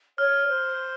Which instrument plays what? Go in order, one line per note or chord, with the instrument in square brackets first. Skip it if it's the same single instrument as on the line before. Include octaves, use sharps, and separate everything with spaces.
[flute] C#5 [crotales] F6
[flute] C5